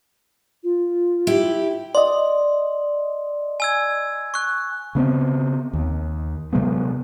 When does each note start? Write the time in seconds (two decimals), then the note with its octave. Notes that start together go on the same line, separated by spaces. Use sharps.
0.64 F4
1.27 E4 G4
1.95 D5 D#5 C6
3.60 G#5 E6 G#6
4.34 C#6 F#6
4.95 C#3 B3 C4
5.73 D#2
6.53 C3 F#3 G#3 B3